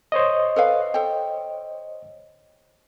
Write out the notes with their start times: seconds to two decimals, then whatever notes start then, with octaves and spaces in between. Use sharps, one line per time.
0.12 C5 C#5 D#5
0.56 A4 B4 F5
0.94 A4 G5